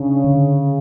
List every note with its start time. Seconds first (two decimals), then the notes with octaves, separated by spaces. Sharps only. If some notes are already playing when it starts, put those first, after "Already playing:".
Already playing: C#3 D4
0.24 D3